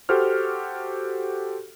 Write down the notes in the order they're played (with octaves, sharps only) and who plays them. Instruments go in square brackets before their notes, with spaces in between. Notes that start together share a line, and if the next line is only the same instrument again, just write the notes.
[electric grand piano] F#4 G4 A4 C5 F6